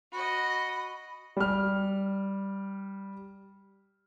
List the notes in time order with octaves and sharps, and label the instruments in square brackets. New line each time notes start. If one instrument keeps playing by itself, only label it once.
[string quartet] F#4 D#5 [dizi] B5
[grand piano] G3 F6